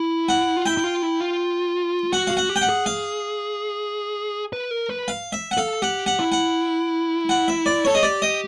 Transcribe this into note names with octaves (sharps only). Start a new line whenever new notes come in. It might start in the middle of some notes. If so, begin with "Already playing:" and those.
Already playing: E4
F#5
F4
E4 G5
E4
F4
E4
F4
F#4 F#5
F#4 F5
F#5
G4
G5
F#5
G#4
F5
B4
A#4
B4
F5
E5
F#5
A4 F5
G4 F#5
F#5
E4
F#5
F#5
E5
D5
A4 C#5
G#4 D#5
G4 D5
D#5